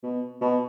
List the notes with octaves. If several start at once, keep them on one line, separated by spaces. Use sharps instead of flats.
B2
B2